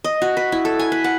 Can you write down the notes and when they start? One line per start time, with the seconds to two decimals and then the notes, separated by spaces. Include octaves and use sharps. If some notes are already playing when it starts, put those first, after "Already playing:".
0.04 D#5
0.22 F#4
0.37 B4
0.52 E4
0.65 A4
0.79 G#5
0.92 B4
1.04 F#5